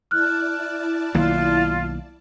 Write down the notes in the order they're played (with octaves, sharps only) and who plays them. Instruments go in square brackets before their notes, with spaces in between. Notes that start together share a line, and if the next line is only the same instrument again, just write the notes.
[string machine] E4 D5 A5 [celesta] F6 F#6
[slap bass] B1 D#3 A#3 [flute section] F4